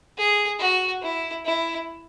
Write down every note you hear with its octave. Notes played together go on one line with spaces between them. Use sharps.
G#4
F#4
E4
E4